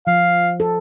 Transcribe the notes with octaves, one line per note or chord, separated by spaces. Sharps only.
F3 F5
A4